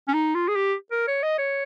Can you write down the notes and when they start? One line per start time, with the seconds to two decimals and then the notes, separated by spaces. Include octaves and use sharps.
0.08 C#4
0.14 D#4
0.35 F4
0.48 G#4
0.56 G4
0.92 A#4
1.08 C#5
1.23 D#5
1.39 C#5